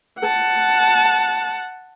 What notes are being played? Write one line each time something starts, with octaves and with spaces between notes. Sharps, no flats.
F#5 A5